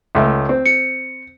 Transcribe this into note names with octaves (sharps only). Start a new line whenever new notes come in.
C#2 A3
C4
C#7